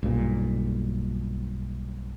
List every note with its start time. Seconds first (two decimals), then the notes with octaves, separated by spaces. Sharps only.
0.03 B1 G2 A#2